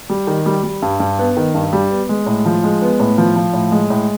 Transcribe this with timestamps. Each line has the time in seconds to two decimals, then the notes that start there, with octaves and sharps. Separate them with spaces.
0.10 G3
0.27 D#3
0.46 G3
0.63 G3
0.82 G2
1.00 G2
1.19 B3
1.37 D#3
1.54 G2
1.73 G3
1.91 B3
2.09 G#3
2.26 A2
2.46 F3
2.64 G#3
2.82 B3
2.99 A2
3.18 F3
3.36 F3
3.53 A2
3.72 G#3
3.90 A2